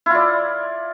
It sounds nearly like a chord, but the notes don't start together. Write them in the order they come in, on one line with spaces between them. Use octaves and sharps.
E4 F4 D5